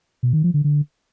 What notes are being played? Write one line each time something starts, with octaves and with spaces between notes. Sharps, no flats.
B2
D#3
F3
D3
D3